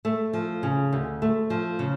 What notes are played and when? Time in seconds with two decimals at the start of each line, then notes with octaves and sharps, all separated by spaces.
0.05 A3
0.33 F3
0.63 C#3
0.93 D2
1.22 A3
1.50 F3
1.79 C#3